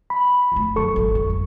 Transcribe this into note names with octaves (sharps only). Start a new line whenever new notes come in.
B5
F2 A3
F#2 D3 A4 C#6
G#1 E3
F2